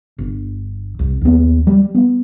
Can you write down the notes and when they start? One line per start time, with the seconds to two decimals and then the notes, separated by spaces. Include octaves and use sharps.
0.18 G1
0.99 C2
1.21 D#2 B3
1.67 G3
1.95 B3